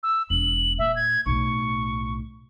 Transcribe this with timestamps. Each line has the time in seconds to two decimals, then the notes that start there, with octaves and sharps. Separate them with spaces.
0.03 E6
0.30 E1 F#7
0.79 A#2 E5
0.96 G#6
1.26 B1 A2 C#6